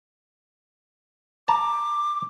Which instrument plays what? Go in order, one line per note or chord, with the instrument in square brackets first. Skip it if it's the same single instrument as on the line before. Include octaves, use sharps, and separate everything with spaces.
[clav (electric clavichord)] A5 A#5 [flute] D6